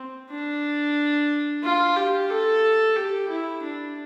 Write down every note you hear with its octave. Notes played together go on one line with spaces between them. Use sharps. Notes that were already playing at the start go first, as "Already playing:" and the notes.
Already playing: C4
D4
F4
G4
A4
G4
E4
D4